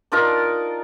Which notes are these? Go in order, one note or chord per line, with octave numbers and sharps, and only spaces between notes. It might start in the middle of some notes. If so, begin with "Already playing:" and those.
D4 D#4 F4 A#4